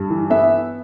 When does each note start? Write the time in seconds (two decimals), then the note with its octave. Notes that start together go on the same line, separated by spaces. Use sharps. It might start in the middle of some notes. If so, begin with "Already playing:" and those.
Already playing: G2
0.10 E3
0.30 B3 E5